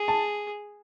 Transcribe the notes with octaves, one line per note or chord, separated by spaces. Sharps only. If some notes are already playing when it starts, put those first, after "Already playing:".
Already playing: G#4
A5